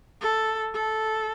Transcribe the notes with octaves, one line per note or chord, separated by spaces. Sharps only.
A4
A4